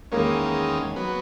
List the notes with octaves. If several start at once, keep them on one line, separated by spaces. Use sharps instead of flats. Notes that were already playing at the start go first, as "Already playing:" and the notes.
E2 D#3 G#3 A#3 C#4
F#3 B3